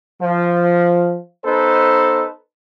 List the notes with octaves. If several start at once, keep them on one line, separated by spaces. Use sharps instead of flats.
F3
B3 D#4 A4 B4 C5